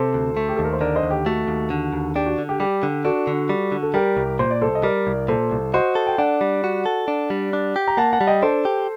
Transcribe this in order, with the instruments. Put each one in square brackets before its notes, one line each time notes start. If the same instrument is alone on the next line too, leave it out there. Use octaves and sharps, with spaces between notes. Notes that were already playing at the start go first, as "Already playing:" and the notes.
Already playing: [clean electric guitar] C3 [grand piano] A4 C5
[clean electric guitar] D2
A3
[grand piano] G4
[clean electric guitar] D#2 [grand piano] A4
[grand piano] A#4
C5
[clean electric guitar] D3 [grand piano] A#4 D5
[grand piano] C5 D#5
[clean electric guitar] D#2
[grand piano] G4
[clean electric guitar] A3 [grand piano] F#4 A4
[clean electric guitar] D#2
D3
D#2
[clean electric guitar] D4 [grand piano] G4
[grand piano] F#4
[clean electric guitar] D3
[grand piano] G4
[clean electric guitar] G3 [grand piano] G4
[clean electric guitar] D3
[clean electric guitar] D4 [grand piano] F#4 A4
[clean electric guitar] D3
G3
D3
[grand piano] A4
[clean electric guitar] G3 [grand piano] G4 A#4
[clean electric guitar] C2
[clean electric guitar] A#2 [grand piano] C5
[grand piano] D5
[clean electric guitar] C2 [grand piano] A4 C5
[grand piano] D#5
[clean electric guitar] G3 [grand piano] A#4 D5
[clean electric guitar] C2
[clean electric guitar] A#2 [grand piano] A4 C5
[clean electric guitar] C2
[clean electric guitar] F#4 [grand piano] C5 D#5
[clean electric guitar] A4
[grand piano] G5
[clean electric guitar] D4 [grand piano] D5 F#5
[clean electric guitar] G3
F#4
A4
D4
G3
D4
G4
[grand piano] A#5
[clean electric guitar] A#3 [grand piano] F#5 A5
[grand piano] F#5 A5
[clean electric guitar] G3
[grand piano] D#5 G5
[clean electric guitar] D4 [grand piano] A4 C5
[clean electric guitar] G4